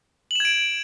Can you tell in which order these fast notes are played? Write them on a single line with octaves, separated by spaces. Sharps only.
F#7 E7 G#6 D7